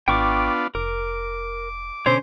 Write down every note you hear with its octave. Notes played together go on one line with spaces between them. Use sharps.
G#1 B3 D4 F4 G5 C#6 D6
F1 A#4 D6
B2 D3 C#4 C5 C#5